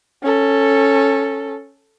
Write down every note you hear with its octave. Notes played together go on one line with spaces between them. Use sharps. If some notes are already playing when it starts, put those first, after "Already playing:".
C#4 A4